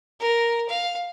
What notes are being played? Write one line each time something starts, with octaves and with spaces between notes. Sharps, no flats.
A#4
F5